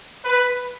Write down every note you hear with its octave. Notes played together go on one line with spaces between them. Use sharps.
B4